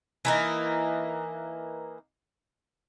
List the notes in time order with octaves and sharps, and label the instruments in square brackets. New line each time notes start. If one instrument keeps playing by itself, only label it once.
[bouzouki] E3 A#3 D#4